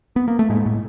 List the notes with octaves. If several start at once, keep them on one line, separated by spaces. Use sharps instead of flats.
B3
A#3
A3
A2 G#3
A2